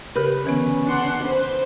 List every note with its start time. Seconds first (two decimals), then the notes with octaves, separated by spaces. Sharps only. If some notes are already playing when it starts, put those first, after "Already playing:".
0.16 C#3 G4 A#4 B4
0.45 D3 E3 B3 C#4
0.86 D4 F#5 C6
1.24 B4 C5